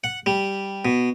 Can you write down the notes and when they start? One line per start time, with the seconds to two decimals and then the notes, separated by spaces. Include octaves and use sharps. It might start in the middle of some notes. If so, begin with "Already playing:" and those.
0.04 F#5
0.26 G3
0.85 B2